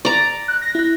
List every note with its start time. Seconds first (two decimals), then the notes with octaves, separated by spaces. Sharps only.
0.05 D5 A#5
0.48 F#6
0.62 A#6
0.75 E4 F#6